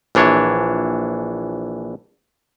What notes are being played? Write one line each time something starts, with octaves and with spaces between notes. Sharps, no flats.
A#1 E3 D4 C#5